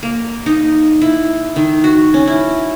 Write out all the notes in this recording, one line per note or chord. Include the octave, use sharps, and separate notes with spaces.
A#3
D#4
E4
D#3
F#4
C#4
E4